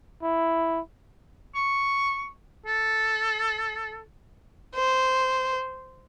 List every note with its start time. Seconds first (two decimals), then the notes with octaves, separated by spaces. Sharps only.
0.23 E4
1.55 C#6
2.66 A4
4.75 C5